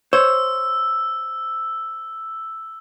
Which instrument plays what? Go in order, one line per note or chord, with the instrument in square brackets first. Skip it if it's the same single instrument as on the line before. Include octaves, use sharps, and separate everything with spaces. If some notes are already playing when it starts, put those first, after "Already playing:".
[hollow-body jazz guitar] C5 C#5 [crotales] E6